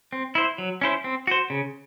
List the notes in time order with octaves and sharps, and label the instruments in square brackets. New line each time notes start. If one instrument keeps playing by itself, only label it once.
[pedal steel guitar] C4
E4 C5
F#3
C#4 E4 C5
C4
F#4 C5
C#3